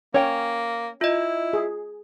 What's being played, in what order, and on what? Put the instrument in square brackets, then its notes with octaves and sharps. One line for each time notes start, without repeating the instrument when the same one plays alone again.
[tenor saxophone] A#3 [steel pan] C#4 [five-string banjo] C#5 G5
[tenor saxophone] E4 [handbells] F4 D#5
[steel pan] G#4